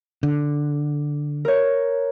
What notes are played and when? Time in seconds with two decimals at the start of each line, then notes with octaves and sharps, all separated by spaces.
0.23 D3
1.45 A#4 C#5